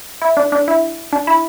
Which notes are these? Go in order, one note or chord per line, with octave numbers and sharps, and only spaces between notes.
E4
D4
D4
E4
D4
E4